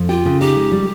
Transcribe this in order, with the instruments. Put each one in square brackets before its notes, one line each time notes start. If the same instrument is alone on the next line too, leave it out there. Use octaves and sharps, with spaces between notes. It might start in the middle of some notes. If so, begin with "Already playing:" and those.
Already playing: [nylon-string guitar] F2
[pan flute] F4 [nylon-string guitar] G4
[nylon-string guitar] C#3
[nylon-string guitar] D#4 [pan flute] G4
[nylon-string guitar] G#3
G3